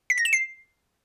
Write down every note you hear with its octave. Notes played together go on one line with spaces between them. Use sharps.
B6
A#6
E7
C7